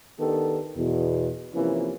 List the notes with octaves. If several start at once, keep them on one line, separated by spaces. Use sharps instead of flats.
D#3 B3 D4 G4 A4
E2 B2
C3 E3 F3 A#3 C#4